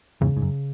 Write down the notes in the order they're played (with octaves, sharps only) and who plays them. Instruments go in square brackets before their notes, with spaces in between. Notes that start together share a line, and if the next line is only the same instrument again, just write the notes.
[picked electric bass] E2 G#2 [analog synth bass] C#3
[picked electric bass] G#2
F#2